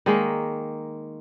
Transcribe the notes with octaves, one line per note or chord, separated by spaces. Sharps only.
D#3 G#3 A#3